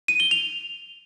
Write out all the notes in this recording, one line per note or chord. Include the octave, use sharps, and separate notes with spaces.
D#7
G7
F7